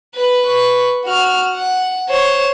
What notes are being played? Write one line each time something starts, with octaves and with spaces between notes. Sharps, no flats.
B4
B4 C#6
F#4 F6
F#5
C5 C#5